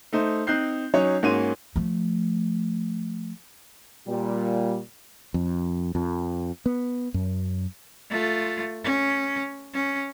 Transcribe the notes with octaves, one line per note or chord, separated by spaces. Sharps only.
A3 D#4 C5
C4 D#4 F#6 G6 C7
F#3 C#4 D#4 C#5
G#2 A#3 C#4 F#4 C6 D#7
F3 A3
A#2 G3
F2
F2
B3
F#2
A3 F4
C#4
C#4